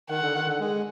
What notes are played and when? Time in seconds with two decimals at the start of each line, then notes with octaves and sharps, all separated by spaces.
0.10 D#3 F#5
0.22 D3
0.35 D#3
0.47 D3
0.60 G#3